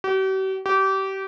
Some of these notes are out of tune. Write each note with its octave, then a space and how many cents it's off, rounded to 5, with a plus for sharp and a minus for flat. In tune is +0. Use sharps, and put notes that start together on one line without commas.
G4 -45
G4 -25